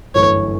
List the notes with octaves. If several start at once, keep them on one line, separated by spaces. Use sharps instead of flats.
G1 F#2 E3 A3 C#5